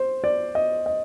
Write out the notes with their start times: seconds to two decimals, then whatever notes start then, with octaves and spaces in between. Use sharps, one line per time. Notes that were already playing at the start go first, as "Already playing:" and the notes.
Already playing: C5
0.24 D5
0.55 D#5
0.86 D#5